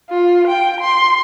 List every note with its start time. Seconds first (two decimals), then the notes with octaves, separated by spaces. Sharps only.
0.10 F4
0.47 G5
0.81 C6